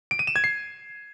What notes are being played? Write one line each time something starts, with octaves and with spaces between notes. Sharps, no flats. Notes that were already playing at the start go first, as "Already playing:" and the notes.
D7
D#7
E7
G#6
C7